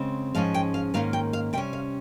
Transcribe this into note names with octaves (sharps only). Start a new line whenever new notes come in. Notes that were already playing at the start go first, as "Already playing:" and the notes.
Already playing: C#3 G#3 C4
G#2 F3 G#3 C#4 F5
G5
F5
G#2 D#3 A#3 C#4 F5
G5
F5
C3 G3 C#4 G5
F5